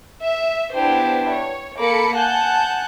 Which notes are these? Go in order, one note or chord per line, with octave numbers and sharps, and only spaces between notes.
E5
B3 D4 E4 G4 C5
C#5
A#3 A4 A#4 B5 D6 C#7
F#5 G#5 A5 F#6 G6